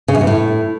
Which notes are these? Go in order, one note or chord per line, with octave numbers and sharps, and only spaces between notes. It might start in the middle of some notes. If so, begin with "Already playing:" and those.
C#3
F#2
E2
A2